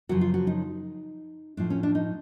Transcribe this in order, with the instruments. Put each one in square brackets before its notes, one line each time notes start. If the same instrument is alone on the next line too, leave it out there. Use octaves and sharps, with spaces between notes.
[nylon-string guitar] F#2 C#3 F3 F#4
F4
F#4
D#4
A2 F3 D4
C#4
D4
D#4